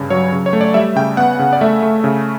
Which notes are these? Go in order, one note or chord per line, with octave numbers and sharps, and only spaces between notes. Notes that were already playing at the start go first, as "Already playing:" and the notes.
Already playing: G2 C#3
F#3 C#5
C#3
C#5
A3
D5
G3 E5
C#3 G5
B3 F#5
C#3
D5
A3 E5
A3
C#3